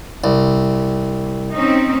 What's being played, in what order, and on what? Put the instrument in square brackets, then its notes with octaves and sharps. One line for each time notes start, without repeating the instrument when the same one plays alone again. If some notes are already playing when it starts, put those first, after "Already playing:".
[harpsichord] C2
[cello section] C4 C#4 D#4